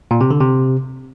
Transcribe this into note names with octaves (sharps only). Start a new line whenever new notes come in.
A#2
C3
D3
C3